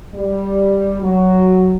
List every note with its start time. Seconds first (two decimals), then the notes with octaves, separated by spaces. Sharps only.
0.15 G3
1.02 F#3